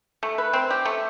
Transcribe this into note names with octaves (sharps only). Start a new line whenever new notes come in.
A3
B4
C4
G4
A3